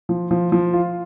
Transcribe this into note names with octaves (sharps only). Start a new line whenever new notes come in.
F3
F3
F3
F4